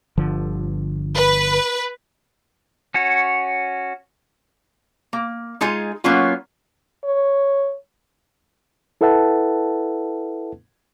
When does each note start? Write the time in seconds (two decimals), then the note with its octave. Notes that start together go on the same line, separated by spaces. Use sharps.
0.17 G1 D3 F3
1.15 B4
2.94 C#4 F#4 C#5
5.13 A#3
5.61 G#3 D#4 F4 G#4
6.04 F#3 A#3 B3 C#4 F4
7.04 C#5
9.01 E4 A4 B4 E5 F#5 A5